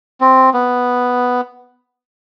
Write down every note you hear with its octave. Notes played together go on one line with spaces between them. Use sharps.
C4
B3